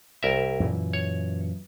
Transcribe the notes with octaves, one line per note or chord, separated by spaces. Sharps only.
C2 A#4 E5
F#2 A#2 E3
C#5